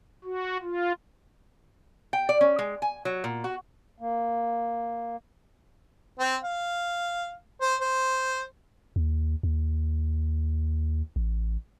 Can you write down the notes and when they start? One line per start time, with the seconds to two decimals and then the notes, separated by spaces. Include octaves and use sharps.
0.24 F#4
0.62 F4
2.13 G5
2.29 D5
2.41 C#4
2.59 G#3
2.82 G#5
3.05 F#3
3.24 A#2
3.44 F#4
4.00 A#3
6.19 C4
6.43 F5
7.61 C5
7.81 C5
8.96 D#2
9.43 D#2
11.16 A1